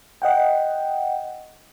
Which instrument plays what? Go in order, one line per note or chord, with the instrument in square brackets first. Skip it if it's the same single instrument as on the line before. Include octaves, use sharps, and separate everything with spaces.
[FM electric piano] D#5 F#5 G5